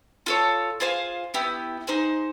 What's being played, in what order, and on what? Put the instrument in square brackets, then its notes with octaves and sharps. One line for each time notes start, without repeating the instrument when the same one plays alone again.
[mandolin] F4 A4 C#5
F4 G#4 C5 F5
B3 E4 G4
D#4 G#4 C5